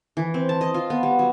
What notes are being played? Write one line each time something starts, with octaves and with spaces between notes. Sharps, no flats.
E3
C4
A5
D#5
F4
B3
G3
F#3